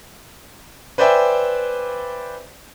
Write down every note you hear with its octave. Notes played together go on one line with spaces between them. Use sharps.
B4 C5 D5 E5 G5 G#5